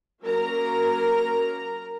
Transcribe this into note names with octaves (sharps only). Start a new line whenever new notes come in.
F#3 A#3 C#4 A#4 A#5